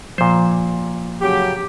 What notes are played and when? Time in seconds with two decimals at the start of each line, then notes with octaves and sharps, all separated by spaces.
0.18 A#2 F3 C5
1.21 C#3 F#3 G4